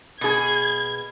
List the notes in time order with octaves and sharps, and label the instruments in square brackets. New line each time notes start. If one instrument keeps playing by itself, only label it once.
[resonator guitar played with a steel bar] B2 G#4 [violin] G#6